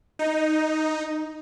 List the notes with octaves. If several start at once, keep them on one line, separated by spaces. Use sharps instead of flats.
D#4